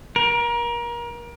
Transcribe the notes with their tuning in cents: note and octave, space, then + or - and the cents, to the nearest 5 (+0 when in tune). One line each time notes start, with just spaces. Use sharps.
A#4 +30